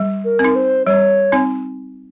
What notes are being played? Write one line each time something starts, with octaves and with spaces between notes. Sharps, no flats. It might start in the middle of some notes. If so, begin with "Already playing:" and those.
Already playing: G3
A#4
C4
D#4
C5
G3 C#5
C4 D#4